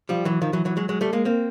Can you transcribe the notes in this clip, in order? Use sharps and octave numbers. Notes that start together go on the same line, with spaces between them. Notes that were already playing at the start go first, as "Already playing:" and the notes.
F3 G3
E3 F#3
D#3 F3
E3 F#3
E3 F#3
F#3 G#3
F#3 G#3
G3 A3
G#3 A#3
A#3 C4